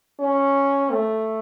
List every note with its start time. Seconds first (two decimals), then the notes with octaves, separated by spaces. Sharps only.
0.20 C#4
0.91 A3